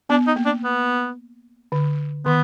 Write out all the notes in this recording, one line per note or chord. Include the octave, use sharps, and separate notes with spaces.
B3 D4
D#4
A#3
D4
B3
D3
D#3 B3